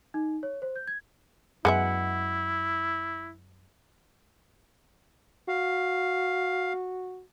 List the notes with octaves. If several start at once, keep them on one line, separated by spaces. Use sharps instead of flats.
D#4
C#5
C5
G6
G#6
F#2 G#3 B3 E4 E5 F#5
F#4 F5